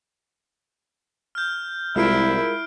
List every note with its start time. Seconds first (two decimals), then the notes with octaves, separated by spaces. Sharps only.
1.35 F6 G6
1.96 C2 G#3 E4 F4 A#4 F6 C7 D7